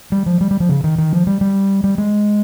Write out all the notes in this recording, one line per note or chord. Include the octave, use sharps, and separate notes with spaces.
G3
F3
G3
G3
F3
C#3
D#3
D#3
F3
G3
G3
G3
G#3